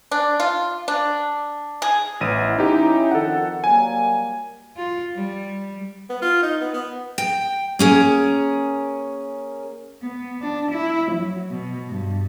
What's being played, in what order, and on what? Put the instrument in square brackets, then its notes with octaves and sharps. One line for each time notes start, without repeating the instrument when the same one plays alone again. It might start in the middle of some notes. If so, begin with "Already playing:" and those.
[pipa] D4
F4
D4
G#4
[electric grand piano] A1 D#7 [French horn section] B3 E4
[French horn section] C#4 E4 [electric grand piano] D#4 G4
[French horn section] F2 D#3 [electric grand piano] A4 F#5
[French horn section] F#3 G3 A#3 [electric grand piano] G#5
[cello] F4
G3
[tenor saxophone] B3
F4
D#4
B3
B3
[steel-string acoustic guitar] G5
A#3 C#4 G#4
[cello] B3
D4
E4
F#3
B2
G2